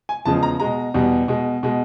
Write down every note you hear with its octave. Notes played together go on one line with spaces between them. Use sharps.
G#5
E2 C#3 F3 G#3 A5
A#5
B2 G#3 A#5
E2 B2 G3
B2 G#3
B2 G#3